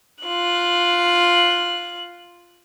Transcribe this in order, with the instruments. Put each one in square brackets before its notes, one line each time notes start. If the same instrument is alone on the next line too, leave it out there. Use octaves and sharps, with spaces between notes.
[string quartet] F4 F#6